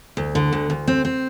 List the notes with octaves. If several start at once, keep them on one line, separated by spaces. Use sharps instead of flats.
D2
D3
D2
D2
C4
C4